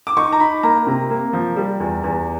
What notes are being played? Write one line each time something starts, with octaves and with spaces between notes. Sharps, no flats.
D6
D#4 C#6
A#5
D#4 B5
A#3 A#5
C3
A#3
F3
G3
E2
E2